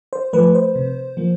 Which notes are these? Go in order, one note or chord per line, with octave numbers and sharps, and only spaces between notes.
C5
F3 A3 B4
C5
C3
F3 A#3